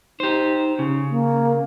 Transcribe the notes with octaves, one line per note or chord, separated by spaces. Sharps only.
D#4 G4 C5
C#3
A#3